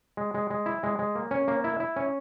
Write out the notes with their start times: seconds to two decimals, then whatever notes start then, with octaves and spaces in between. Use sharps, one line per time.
0.17 G#3
0.34 G#3
0.50 G#3
0.66 E4
0.83 G#3
0.99 G#3
1.15 A#3
1.31 C#4
1.48 A#3
1.64 E4
1.80 E4
1.96 C#4